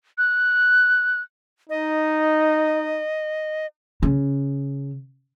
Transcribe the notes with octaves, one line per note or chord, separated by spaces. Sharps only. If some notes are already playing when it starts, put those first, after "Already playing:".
F#6
D#4 D#5
C#3